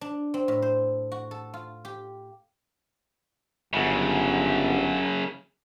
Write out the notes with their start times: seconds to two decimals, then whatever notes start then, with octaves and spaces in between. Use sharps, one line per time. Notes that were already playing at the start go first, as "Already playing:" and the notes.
0.01 D4
0.34 C4
0.48 A2
0.62 C5
1.12 F#4
1.31 A4
1.54 F4
1.85 G4
3.73 G1 F#2 C#3